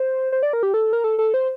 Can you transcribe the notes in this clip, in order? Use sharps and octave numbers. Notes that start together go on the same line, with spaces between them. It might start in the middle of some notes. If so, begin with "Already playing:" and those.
Already playing: C5
C5
D5
A#4
G4
A4
A#4
A4
A4
C5